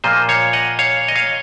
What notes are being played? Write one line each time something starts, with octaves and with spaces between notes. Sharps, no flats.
A#2 F3 A#3 C5 D#5
C#5 F5
D#5 F#5
C#5 F5
D#5
C#5 F5